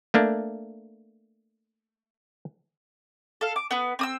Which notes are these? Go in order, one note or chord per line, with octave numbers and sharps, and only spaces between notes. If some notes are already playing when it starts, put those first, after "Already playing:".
A3 A#3 D4
A4 F5
D6
B3 B4
C4 D#6 E6